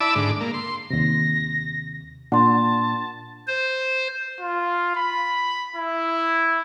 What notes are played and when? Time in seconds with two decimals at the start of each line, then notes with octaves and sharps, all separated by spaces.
0.01 E4 D5 A5 B5 D6 E6
0.15 G#2 D3 D6
0.41 A#3
0.54 C6
0.90 D#2 C3 A#6
2.32 A#2 D4 F#5 A5 C6
3.47 C5
4.41 F4
4.96 B5
5.76 E4